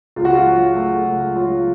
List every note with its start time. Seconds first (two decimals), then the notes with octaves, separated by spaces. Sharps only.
0.16 C#2 F4
0.25 F#4
0.34 F4
0.46 F#3
0.75 A3
1.06 C#2
1.36 F#3 F4